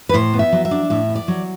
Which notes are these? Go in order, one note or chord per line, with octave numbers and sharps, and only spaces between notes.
B4
A2 C5
B3
E5
F#3
E5
D4
A2 E5
B3
D5
F#3